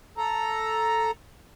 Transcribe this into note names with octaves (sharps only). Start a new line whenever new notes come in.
A4 A#5